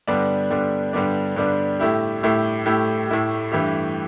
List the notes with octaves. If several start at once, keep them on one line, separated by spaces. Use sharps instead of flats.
G2 D3 G3 B3 D4
G2 D3 G3 B3 D4
G2 D3 G3 B3 D4
G2 D3 G3 B3 D4
A2 A3 E4 G4
A2 A3 E4 G4
A2 A3 E4 G4
A2 A3 E4 G4
G2 E3 A3 E4 G4